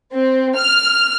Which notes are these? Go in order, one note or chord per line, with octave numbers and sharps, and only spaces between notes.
C4
F6